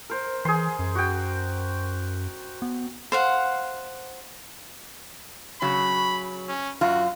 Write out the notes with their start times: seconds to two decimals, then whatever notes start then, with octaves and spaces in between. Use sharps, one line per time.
0.10 A#4 C5
0.45 E3 G#4 C6
0.79 F#2
0.95 F#4 G5
2.62 B3
3.12 C5 F5 F#5
5.62 C#3 F#3 B5
6.48 C#4
6.81 F#2 F4 F#4 A#5